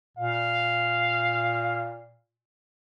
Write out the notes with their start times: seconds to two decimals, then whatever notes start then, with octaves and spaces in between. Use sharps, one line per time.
0.17 A#2 F5